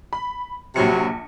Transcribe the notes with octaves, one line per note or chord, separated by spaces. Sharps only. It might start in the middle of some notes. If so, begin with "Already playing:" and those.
B5
A#1 C3 F#3 B5 C#7